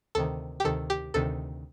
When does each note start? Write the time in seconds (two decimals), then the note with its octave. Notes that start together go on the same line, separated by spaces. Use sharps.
0.15 D2 C3 D#3 A4
0.60 G4
0.64 D2 C3 D#3 A4
0.90 G4
1.14 D2 C3 D#3 A4